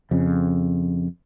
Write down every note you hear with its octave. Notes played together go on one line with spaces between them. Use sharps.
F2 C#3